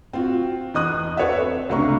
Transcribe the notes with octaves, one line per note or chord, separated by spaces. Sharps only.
C4 F4 F#4
E2 D#5 D#6 F#6
A4 B4 C#5 D5 E5
C4
C#2 C3 A3 D4 A#5 C#6